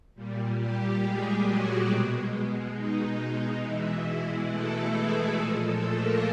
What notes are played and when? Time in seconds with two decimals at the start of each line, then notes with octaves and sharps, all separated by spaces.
0.15 A#2 G3
0.58 G3 G4
1.01 G#3 G#4
1.45 F#3 F#4
1.88 B2 G#3
2.76 D#4
3.19 D#4
3.63 B2 E3 G#3 E4
4.06 E3 E4
4.50 A3 A4
4.93 G#3 G#4
5.37 A#2 F3 G#3 A3 A4
5.66 A3 A4
5.95 A#3 A#4